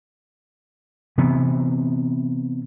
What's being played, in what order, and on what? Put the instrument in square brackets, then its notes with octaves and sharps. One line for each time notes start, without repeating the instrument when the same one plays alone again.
[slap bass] C3 E3 B3